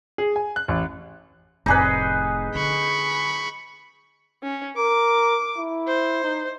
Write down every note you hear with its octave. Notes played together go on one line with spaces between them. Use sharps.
G#4
G#5
F#6
A1
F1 A2 D#4 G#4 B4
D3 D4 B5 C#6
C#4
A#4 D6
E4
C5
D#4